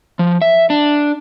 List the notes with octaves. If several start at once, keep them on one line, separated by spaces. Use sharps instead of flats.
F3
E5
D4